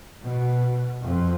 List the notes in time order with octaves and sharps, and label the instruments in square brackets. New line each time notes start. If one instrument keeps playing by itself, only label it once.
[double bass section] B2
F2